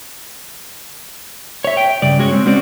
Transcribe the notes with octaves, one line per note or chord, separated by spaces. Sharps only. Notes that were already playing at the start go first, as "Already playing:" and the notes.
C#5 E5
G5
G2 C#3 D5
G#3 C#4 F#4 G#4 C#5
G#3 C4
G#3 C4 C#4 F#4 C5 D5